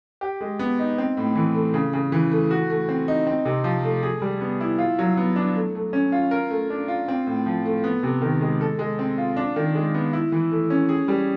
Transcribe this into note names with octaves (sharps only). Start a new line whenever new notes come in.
G4
G#3
B3
D#4
C4
A2
E3
A3
C#3
C#3
E3
A3
F#4
A3
C4
D#4
C4
C3
F3
A3
G#4
G3
B3
E4
F4
F#3
B3
D4
A3
A3
C#4
F4
A#4
A3
D4
F4
C4
A2
F3
A3
B3
C3
D#3
G#3
A4
G#3
C4
F4
D4
D#3
G#3
B3
E4
E3
A3
C#4
G#4
G3